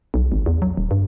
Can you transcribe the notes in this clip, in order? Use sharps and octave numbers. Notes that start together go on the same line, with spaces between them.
B1
G#1
E2
F#3
D#1
G2